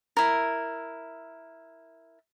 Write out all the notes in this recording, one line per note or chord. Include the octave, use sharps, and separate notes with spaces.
E4 A#4